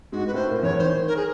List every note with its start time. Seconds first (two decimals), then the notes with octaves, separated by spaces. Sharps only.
0.12 G#2 G#3 F#4
0.27 B4
0.34 A2 A3 C5
0.49 A#2 A#3
0.63 E2 E3 C#5
0.79 D#3 C5
1.08 A#4
1.16 G#4